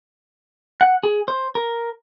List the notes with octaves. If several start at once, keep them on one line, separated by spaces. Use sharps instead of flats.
F#5
G#4
C5
A#4